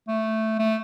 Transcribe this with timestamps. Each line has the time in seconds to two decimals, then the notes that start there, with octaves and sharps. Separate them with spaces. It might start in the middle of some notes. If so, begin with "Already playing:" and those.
0.08 A3
0.59 A3